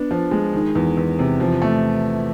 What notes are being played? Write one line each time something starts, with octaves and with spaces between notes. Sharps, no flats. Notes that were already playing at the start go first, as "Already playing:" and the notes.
Already playing: B3 D4
F3
G#3
D#3
E2
E2
C3
F3
A3